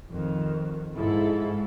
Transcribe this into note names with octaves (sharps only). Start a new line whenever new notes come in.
F2 D#3
G#2 E4 F4 A4